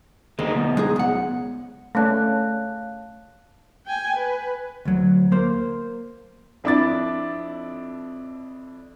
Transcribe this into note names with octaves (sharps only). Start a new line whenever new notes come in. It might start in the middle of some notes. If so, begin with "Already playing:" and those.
D2 G#3 A#3 D#4
F#2 B2
G#3 D#4 G#4
C#2 F#5
A3 C#4 D5 F5 A5 F#6
G5 G#5
B4
D2 F#3
A#3 C5
F2 D4 E4 D6 A6